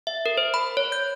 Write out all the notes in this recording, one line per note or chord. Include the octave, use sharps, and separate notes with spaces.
E5
A#4
C5
B5
C#5
G6